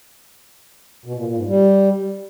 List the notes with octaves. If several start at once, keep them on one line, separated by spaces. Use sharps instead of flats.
B2
A#2
A#2
G#2
G3